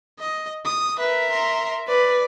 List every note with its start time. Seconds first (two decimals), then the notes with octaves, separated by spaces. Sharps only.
0.19 D#5
0.65 D#6
0.99 A#4 B4 E5
1.30 A#5 C6
1.88 B4 D5